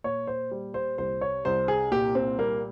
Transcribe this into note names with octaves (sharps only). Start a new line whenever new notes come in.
A#2 C#5
C5
G3
C5
C2 C5
C#5
C2 C5
G#4
A#2 G4
C4
G3 A#3